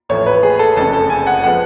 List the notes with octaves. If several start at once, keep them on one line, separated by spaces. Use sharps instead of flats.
A1 A2 F3 A3 C#5
B4
G#4
A4
F#1 F2 D3 G#3 C#4 A4
A4
G#5
F#5
F3 G#3 B3 F#5